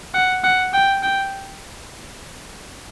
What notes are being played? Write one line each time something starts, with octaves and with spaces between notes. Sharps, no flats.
F#5
F#5
G5
G5